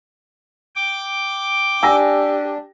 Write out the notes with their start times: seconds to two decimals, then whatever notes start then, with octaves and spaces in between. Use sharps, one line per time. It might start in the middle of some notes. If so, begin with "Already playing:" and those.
0.76 G5 D6
1.83 D4 G4 G#5 E6 A#6